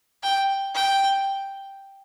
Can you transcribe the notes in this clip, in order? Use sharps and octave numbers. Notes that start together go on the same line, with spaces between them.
G5
G5